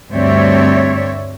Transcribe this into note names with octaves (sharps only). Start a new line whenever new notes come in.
D2 G2 C4 C#5 D5 E5